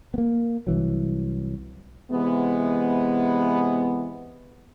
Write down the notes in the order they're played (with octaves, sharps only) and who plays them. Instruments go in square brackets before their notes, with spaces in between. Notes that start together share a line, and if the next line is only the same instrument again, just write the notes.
[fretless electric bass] A#3 B3
C2 E3 F#3
[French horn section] C3 E3 G#3 B3